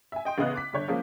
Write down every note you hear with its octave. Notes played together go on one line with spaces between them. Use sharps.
E5 G#5
D#5 G5 C6
A1 C#3 B3 D#5 F5 F#6
D6 B6
G1 D3 C#5 G6
F3 G#3 A#3 C#4